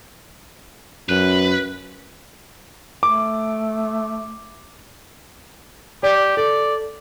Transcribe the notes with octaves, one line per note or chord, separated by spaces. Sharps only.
F#2 B4
A3 D6
G4 D5
A4 D5